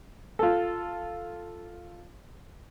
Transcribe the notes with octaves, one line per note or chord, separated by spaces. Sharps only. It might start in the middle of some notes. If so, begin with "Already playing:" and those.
F4 A4